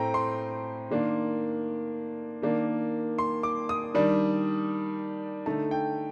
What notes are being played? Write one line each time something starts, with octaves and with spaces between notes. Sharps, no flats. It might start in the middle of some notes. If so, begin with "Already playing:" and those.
Already playing: A2 A3 C4 G5 A#5
C6
D#3 A#3 D4
D#3 A#3 D4
C6
D6
D#6
D#3 G3 D4
D3 A3 D#4 A5
G5